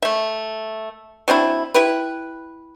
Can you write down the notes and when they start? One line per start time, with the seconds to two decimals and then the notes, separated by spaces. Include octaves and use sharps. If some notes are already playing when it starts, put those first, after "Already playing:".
0.02 A3 E5
1.28 F#3 C4 D4 E4
1.74 E4 G4 B4